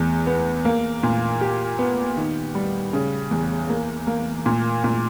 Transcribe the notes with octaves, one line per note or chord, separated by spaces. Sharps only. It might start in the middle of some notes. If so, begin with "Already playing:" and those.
Already playing: E2
B3
A#3
A#2
G4
B3
D#3
G3
C#3
E2
A#3
A#3
A#2
A#2